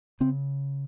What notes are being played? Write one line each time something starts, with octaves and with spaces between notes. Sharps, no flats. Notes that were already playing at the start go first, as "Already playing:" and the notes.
C#3 C4